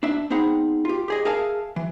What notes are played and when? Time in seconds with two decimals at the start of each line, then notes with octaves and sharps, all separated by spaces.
0.03 D4 E5
0.30 B3 C4 D#4 G#4 F#5 B5
0.85 F4 G4
1.08 G4 G#4 D#5
1.25 G#4 A#4 E5 F5 G#5 A5
1.76 E3